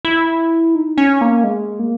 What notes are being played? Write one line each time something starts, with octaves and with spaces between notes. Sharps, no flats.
E4
D#4
C#4
A#3
G#3
A#3